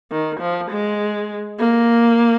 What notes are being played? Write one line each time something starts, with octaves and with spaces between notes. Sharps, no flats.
D#3
F3
G#3
A#3